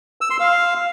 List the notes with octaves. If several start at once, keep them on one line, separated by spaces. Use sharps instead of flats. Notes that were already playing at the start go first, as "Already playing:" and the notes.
E6
C6
F5